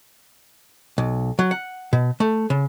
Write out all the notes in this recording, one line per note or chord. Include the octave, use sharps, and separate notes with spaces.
B1
F#3
F#5
B2
A3
C#3